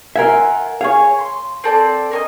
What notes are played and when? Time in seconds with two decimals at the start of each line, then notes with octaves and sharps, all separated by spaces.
0.16 F4 A#4 E5 F#5 G#5
0.81 G#4 C#5 F5
1.19 C6
1.64 C4 A4 D5
2.11 A#4 C#5 D#5